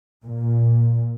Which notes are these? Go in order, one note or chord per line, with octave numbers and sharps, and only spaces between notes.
A#2